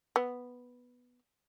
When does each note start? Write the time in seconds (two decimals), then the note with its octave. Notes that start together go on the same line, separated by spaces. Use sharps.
0.16 B3